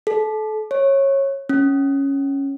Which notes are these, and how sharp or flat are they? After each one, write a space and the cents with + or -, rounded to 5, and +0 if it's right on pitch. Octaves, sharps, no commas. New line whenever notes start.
A4 -30
C#5 -20
C#4 -5